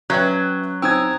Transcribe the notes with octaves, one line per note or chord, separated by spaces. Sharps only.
F#3 C#4 B4 E5 G5 F#6 G#6
C4 D#4 G5 G#5 A#5 D#6 E6 G#6